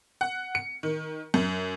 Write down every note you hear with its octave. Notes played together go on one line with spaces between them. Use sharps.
F#5
C#7
D#3
F#2